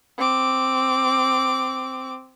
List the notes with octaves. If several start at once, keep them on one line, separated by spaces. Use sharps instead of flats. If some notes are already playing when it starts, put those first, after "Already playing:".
C4 D6